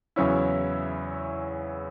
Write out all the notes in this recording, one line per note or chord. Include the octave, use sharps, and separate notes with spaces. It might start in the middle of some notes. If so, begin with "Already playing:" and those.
E2 C#3 F#3 C#4 E4